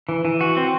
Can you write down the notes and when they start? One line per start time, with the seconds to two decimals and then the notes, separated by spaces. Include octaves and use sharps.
0.09 E3
0.25 E3
0.41 F#4
0.57 C4